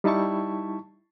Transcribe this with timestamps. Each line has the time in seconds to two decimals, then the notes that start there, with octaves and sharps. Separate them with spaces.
0.04 G3 D#4 E4 A5 C#6